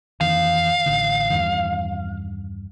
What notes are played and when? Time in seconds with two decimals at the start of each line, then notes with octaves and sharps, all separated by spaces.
0.21 F2 D#3 E3 F5
0.86 A1 D3
1.30 E2 G2 D#3